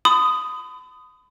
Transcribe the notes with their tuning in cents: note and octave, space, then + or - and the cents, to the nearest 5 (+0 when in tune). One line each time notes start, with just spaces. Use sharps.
B5 +40 D#6 +0